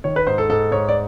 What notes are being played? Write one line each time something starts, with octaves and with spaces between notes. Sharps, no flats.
D#3 C#5
B4
G#2 C5
A4
G#2 A4
G#2 C#5
D5